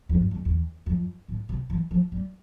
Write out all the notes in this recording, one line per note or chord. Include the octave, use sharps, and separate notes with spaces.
F2
G2
F2
E2
F2
A2
C3
E3
F3
G3